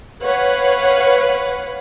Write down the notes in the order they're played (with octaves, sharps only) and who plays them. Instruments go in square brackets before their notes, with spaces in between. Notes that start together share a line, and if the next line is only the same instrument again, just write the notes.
[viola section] B4 C#5 F5 F#5